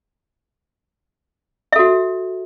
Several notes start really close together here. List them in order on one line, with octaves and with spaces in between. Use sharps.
E5 A4 F#4